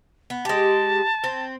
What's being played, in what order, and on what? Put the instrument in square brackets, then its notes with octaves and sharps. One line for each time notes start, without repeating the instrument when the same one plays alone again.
[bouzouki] B3
[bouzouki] G#3 G4 [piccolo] A5
[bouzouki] C4